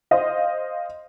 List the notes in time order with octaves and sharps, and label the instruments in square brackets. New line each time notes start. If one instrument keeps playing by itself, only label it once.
[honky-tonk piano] C5 D#5 F5